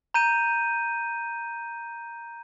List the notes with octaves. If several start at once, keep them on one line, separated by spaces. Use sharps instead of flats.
A#5 G6 D#7